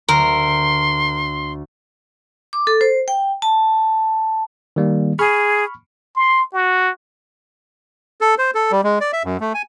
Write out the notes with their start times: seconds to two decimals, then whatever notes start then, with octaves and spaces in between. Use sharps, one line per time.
0.09 D2 A#4 C6
2.53 D6
2.67 A4
2.81 C5
3.08 G5
3.42 A5
4.76 D#3 G3 A#3
5.19 G#4 B5 C#6 F6
6.16 C6
6.53 F#4
8.21 A4
8.38 C5
8.55 A4
8.72 G3
8.84 G#3
9.01 D5
9.13 E5
9.25 F#2
9.40 A3
9.54 G#5